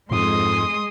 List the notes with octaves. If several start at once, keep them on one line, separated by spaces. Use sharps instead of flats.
F2 G#2 G#3 C6 D#6